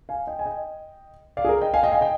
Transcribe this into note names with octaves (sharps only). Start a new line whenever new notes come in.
F5 G#5
D#5 G5
G#5
D#5 G5
D5 F5
G#4
A#4
D#5 G5
F5 G#5
D#5 G5
F5 G#5
D#5 G5